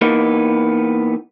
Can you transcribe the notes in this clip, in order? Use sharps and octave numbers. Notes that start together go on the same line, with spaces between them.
E3 A#3 B3 D#4